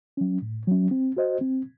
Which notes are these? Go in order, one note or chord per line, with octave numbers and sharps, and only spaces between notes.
F#3 C#4
A2
F#3 C#4
C4
F#4 C5 D#5
C4